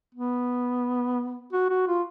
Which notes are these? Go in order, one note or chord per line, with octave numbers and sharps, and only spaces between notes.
B3
F#4
F#4
F4